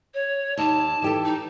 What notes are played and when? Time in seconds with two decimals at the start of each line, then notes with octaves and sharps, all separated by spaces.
0.14 C#5
0.57 D#2 A5
1.02 E3 G4 A4
1.25 D#4